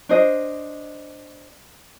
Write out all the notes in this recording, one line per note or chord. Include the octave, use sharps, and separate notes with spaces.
D4 C5 D#5